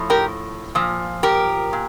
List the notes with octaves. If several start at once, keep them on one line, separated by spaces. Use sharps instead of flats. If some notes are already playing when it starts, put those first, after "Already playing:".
Already playing: A2 F3
G4 A#4
A#2 F3
G4 A#4
A#2